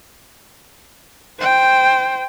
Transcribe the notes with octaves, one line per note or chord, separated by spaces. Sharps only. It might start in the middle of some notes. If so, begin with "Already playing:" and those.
C5 G5